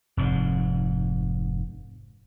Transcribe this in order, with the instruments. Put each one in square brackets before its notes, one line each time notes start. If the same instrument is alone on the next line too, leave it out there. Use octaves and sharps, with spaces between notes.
[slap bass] F1 G#2